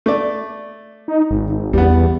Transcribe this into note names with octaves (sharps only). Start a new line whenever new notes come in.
A3 D5
D#4
G#1
E2 G3 B3